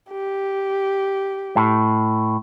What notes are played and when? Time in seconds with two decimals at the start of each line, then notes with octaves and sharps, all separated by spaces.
0.12 G4
1.56 A2